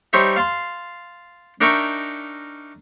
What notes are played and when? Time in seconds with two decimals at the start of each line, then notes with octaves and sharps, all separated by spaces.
0.13 G3 D#4 C5 C#5 E5
0.36 F5 A5 C6
1.61 D4 D#4 A#4 E5 G5 C#6